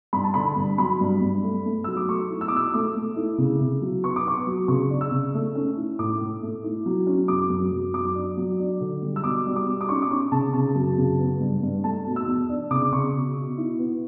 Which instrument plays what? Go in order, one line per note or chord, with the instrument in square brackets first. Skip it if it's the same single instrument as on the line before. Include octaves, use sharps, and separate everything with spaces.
[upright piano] G2 B5
A5
D3 B5
G2
F#3 B5
G2
G2
A3
A3
F#3 E6
D6
A3 C#6
E4
E6
D6
B2 E6
A3 D6
A3
E4
C#3
C#3
F#3
B3 C#6
D6
B3 C#6
F#3
C#3 C#6
D4
E6
C#3
A3
C#4
E4
A2 D6
A2
A3
E4
F#3
C#4
F#2 D6
F#2
F#2
F#3 D6
D4
F#3
D4
D3
G3
E6
B2 D6
G3
D6
B2
D6
C#4 C#6
D6
C#4 C#6
C#3 A5
C#3 A5
F#2
C#3
B3
G2
G2
A3 A5
B2
E6
E2
D4
C#3 D6
C#3 C#6
B2
B2
E4
B3